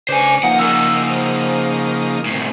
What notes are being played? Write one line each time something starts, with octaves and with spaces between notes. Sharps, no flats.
C#3 D4 B4 C5 G#5
F3 A#3 D#4 F5 F#5
C#3 A#4 E6
C5
A2 C3